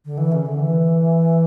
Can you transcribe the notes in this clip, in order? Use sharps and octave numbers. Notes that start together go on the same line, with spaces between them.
D3
E3
C#3
D3
E3